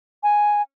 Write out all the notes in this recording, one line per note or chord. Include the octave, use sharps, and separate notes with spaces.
G#5